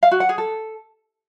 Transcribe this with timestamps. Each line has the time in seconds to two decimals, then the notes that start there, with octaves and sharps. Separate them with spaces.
0.03 F5
0.11 F#4
0.20 F#5
0.29 G#4
0.38 A4